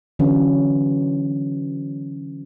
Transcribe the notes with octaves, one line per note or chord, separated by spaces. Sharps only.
D3 E3 F#3 C#4